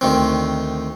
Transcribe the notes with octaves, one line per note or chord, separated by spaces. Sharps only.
D2 D#3 C4